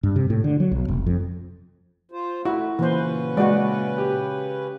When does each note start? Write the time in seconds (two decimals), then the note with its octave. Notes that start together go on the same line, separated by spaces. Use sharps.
0.03 G2
0.16 C3
0.30 A2
0.44 D3
0.60 F#3
0.71 B1
0.88 F1
1.07 F2
2.11 F4 C5
2.45 A3 E4 F#4
2.79 A#2 C#3 E3 A#3 C#4 B4 C5
3.37 G#3 F#4 D5 F#5
3.98 G4